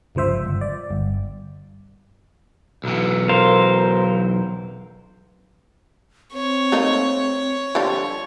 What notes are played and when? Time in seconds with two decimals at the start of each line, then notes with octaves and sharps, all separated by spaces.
0.15 G1 C#2 F3 C5 E5
0.45 G1
0.61 D5
0.91 G1
2.84 B1 E3
3.29 A#4 C5 F5
6.34 C4 C#5
6.72 A3 A#3 D#4
7.75 D3 F3 G3